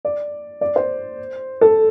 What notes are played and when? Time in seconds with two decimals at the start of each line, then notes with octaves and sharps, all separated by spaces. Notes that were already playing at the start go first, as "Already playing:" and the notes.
0.05 D5
0.61 D5
0.76 C5
1.61 A4